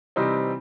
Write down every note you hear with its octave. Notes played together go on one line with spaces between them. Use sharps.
C3 E3 G3 C4 D#4